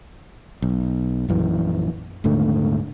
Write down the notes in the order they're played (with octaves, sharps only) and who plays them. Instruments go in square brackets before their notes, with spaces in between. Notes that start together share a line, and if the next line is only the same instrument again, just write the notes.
[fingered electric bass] B1
A#1 F#2 E3
D#1 G#2 D3 A3